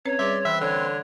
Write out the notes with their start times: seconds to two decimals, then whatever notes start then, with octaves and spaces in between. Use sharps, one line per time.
0.05 C4 C#4 B4 C#5
0.19 G3 G#4 B4 D5 E5 C6
0.45 E3 C4 B4 E5 C6
0.61 D3 C#5